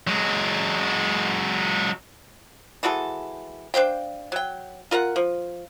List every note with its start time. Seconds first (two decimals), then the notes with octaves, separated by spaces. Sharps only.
0.07 F#3 G#3
2.83 E3 G#3 F#4 A4
3.74 D4 C5 F5 G5
4.32 F#3 G5
4.91 F4 A#4 F5 F#5
5.16 F3